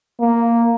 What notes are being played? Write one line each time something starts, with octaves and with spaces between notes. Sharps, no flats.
A#3